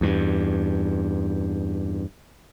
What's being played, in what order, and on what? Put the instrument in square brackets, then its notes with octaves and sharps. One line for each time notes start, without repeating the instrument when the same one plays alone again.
[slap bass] E2 G2